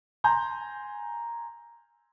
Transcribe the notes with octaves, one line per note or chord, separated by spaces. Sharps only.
G#5 A#5 C6 G6